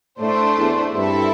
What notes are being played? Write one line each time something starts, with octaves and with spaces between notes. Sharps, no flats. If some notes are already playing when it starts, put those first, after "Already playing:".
A2 A3 D4 C5
E2
G2 C4 E4 A4 E5